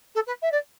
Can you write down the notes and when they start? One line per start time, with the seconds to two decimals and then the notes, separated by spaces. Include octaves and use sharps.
0.15 A4
0.27 B4
0.42 E5
0.51 D5